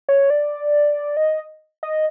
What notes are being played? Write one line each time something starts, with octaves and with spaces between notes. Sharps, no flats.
C#5
D5
D#5
D#5